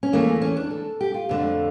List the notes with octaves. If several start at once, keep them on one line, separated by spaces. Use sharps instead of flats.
C#4
E2 E3 A3 A#3
C#4
D4
A4
G4
F4
F2 D3 A3